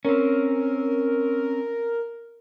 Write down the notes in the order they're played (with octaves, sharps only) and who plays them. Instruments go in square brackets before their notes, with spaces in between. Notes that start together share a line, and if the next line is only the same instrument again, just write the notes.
[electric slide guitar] C4 C#4 [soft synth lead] A#4